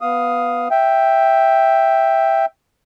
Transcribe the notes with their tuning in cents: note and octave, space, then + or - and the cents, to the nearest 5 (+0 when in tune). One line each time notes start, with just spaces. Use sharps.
B3 +0 F5 +0 D#6 +0
E5 +0 G5 +0